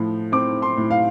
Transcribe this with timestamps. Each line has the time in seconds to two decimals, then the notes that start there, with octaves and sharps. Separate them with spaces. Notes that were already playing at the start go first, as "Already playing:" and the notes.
Already playing: A2 F3
0.32 C4 D6
0.62 C6
0.77 A2
0.91 F5